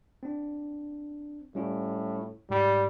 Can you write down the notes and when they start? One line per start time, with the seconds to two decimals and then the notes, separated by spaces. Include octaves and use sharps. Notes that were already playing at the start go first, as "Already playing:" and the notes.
0.23 C4 D4
1.55 A2 G3 C#4 F4
2.50 G#2 G3